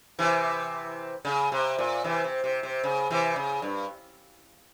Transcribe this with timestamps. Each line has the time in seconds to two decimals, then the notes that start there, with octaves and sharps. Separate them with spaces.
0.19 C3 E3
1.25 C#3
1.52 C3
1.78 A#2
2.04 C3 E3
2.24 C3
2.44 C3
2.63 C3
2.83 C#3
3.10 C3 E3
3.36 C#3
3.62 G2